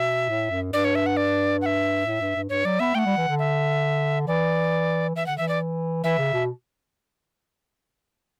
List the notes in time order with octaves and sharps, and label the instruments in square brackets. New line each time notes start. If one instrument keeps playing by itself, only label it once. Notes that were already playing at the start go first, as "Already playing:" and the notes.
Already playing: [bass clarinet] B2 [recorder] E5
[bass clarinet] A2
F#2
[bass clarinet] G2 [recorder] D5
[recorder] C#5
E5
F#5
D5
F#5
E5
[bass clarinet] A2
G2
G2
[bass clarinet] G2 [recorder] C#5
[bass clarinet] F#3 [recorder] D5
[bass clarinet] B3 [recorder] E5
[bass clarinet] A3 [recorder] F#5 G5
[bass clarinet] G3
E3
D3
[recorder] E5
[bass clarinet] E3 [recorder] D5
[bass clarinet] E3 [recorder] E5
[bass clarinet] D3 [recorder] F#5
[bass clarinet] E3 [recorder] E5
[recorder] D5
[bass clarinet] E3 [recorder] E5
[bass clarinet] C#3
B2